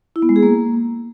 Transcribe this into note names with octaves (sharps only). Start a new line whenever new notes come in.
E4
B3
G#3
G#4
A#3